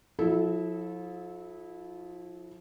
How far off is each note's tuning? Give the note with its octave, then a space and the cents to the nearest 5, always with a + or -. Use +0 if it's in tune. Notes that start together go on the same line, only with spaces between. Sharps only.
F3 +35 E4 -15 A4 -25